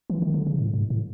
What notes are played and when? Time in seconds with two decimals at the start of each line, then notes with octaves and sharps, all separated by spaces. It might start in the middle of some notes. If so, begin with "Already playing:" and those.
0.10 E3
0.22 D#3
0.34 D3
0.47 C#3
0.58 A2
0.74 G#2
0.90 A2